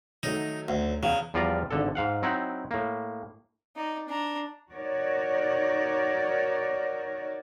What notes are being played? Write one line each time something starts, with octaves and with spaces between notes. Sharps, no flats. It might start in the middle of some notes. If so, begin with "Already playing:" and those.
D#3 F#3 A3 D#4
D2
E2 C#3
E2 F3 G3 F4 D5 A#5
G#1 D3 A4
G#2 F5 F#5
F#3 C4 D#4 E4 F#5
A2 A#3
D#4 D5
D4 A#5
D#4 F#4 A#4 C#5 D5